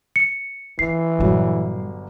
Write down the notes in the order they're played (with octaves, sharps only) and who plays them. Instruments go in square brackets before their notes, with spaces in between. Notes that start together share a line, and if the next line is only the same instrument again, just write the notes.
[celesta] C#7
[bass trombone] E3 [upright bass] F4 [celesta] C7
[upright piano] G1 F#3 [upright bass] A#2 G3